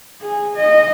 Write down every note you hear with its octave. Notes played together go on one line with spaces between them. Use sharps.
G#4
D#5